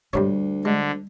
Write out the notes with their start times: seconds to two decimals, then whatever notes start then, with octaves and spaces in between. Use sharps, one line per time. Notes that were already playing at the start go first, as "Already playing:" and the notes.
0.13 D2 G2 C3 G3 C#5
0.65 D3 G#3